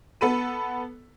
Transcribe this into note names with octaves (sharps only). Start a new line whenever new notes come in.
B3 A4 B5 D#7